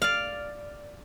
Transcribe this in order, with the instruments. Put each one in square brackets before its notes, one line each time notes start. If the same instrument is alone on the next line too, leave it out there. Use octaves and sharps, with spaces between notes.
[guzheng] D5 F5